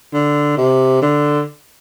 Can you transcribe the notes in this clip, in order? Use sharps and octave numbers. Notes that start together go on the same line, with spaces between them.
D3
C3
D3